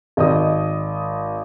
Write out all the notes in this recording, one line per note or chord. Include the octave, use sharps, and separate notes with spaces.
G#1 D#5 D#6